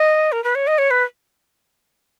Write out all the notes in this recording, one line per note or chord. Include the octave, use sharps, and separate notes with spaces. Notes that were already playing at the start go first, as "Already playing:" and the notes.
Already playing: D#5
A#4
B4
C#5
D#5
C#5
B4